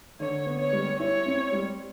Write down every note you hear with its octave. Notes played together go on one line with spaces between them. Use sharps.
D3 C#5
B3
C#5
G3
E4 C#5
C4
G3